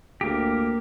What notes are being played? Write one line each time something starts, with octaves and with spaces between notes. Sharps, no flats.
D2 A#3 G4